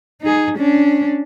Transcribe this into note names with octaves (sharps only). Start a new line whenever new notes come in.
D#4 G#4
C#4 D4